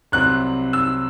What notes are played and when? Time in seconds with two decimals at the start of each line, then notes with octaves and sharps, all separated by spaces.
0.12 C2 C3 F#3 C4 F#6
0.73 E6